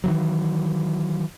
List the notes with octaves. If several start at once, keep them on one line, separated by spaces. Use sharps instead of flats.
D#3 E3 F#3